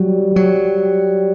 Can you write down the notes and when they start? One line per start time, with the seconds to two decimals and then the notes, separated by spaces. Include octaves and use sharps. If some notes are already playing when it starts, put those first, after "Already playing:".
Already playing: F#3 G3
0.36 F#3